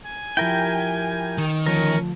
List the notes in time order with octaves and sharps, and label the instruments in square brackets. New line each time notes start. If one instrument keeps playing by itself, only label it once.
[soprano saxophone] G#5
[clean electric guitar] F3 E4 [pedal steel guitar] G4 A#4 G5
[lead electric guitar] D#3
[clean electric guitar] D2 F3 [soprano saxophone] C#4 [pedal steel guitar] A#4